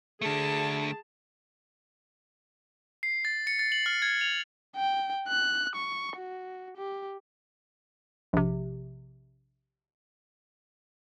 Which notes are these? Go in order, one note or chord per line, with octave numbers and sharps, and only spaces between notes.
D3 A3 G#4 A5
C7
A6
C#7
A6
F#7
F6
G#6
F7
G5
F#6
C#6
F#4
G4
A#1 C3